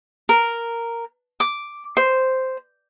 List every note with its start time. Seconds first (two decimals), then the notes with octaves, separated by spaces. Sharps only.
0.29 A#4
1.40 D6
1.97 C5